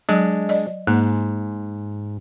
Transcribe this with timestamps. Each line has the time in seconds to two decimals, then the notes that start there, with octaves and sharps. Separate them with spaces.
0.09 F#3 G#3 D4
0.49 D5 D#5
0.87 G#2 A#3